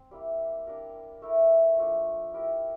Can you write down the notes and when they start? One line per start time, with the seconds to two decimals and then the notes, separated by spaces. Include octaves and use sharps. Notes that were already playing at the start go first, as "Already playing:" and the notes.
Already playing: C4 C5
0.11 G3 A#3 E4
0.67 A#3 D4 G4 A#4
1.22 A3 E4 A#4
1.78 F3 A3 D4
2.33 E4 G4 A#4